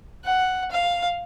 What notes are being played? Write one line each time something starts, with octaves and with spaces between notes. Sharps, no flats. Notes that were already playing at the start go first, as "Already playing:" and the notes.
F#5
F5